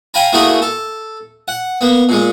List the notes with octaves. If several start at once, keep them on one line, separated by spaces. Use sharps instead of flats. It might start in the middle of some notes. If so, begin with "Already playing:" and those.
F5 G5 G#5 A#5 B5
A3 A#3 E4 F#4 G#4 A#4
A4
F#5
A#3 B3
A#2 G#3